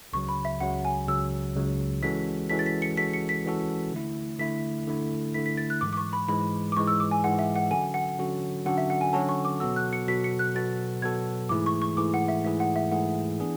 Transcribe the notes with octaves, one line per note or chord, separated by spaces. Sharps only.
C#2 C#3 F#3 C#6
B5
E5
C#2 C#3 F#3 F#5
G#5
C#2 C#3 F#3 E6
C#2 C#3 F#3
E3 G#3 C#4 F#4 A4 B6
E3 G#3 C#4 F#4 A4 B6
A6
B6
C#7
E3 G#3 C#4 F#4 A4 B6
C#7
B6
E3 G#3 C#4 F#4 A4
D3 A3 E4
D3 A3 E4 B6
D3 A3 E4
D3 A3 E4 B6
B6
A6
F#6
G#2 E3 G#3 D6
D6
C#6
B5
G#2 E3 G#3 B5
D6
G#2 E3 G#3 C#6
E6
D6
G#5
G#2 E3 G#3 F#5
E5
F#5
D3 F#3 C#4 F#4 A4 G#5
F#5
D3 F#3 C#4 F#4 A4
D3 F#3 C#4 F#4 A4 F#5
E5
F#5
G#5
D3 F#3 C#4 F#4 A4 A5
C#6
D6
B2 F#3 B3 F#4 A4 E6
F#6
C#7
B2 F#3 B3 F#4 A4 B6
C#7
F#6
B2 F#3 B3 F#4 A4 A6
B2 F#3 B3 F#4 A4 G#6
G#2 E3 A3 E4 G#4 D6
C#6
C#6
G#2 E3 A3 E4 G#4 D6
F#5
E5
G#2 E3 A3 E4 G#4 E5
F#5
E5
G#2 E3 A3 E4 G#4 F#5
E3 B3 D4 G#4